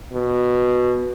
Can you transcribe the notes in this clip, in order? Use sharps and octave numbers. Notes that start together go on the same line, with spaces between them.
B2